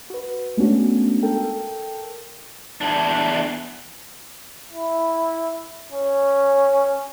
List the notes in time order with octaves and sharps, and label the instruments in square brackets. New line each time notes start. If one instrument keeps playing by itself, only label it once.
[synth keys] F#4 B4
G#3 A3 B3 C#4 D4 F#4
A4 A#4 G5
[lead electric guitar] E2 D4
[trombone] E4
C#4